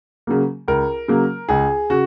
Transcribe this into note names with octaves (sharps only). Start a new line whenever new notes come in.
C#3 F#3 A#3
C#2 A#4
C#3 F#3 A#3
C#2 G#4
C#3 F#4